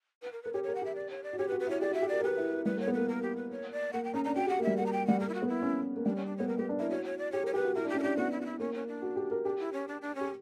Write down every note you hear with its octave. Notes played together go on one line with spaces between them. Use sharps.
B4
A#4
A#4 B4
G4 C#5
C#5
A#4
F#5
G4 E5
D5
C#5
D5
F#4
G4 C#5
B4
F#4
B4
E4 C#5
G4 D5
F#4
E5
G4
A#4 D5
A#4
G4 B4
E4
G3 B4
A#3
C#5
B3
A#3 B4
A#4
G4
B4
C#5
D5
A#3 F#5
G5
C#4 A#5
D4 A#5
F#4 G5
G4
F#5
A#3
G3 E5
A#3 F#5
A#5
G5
G3 F#5
A#3 A#4
E4
F#4
B3
E4
C#4
A#3
G3 D4
C#4
D4
B3 C#5
A#3 A#4
B3 G4
D4
E4 A#4
F#4 C#5
C#5
D5
G4 C#5
A#4
C#5
G4 B4
F#4
E4 A#4
D4
C#4 G4
A#4
D4 G4
B3 F#4
E4
F#4
E4
A#3 C#4
C#4
D4
F#4
G4
A#4
D4 G4
E4
C#4
D4
D4
C#4
G4